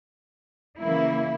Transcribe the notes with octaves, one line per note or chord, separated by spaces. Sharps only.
C#3 E3 A#3 E4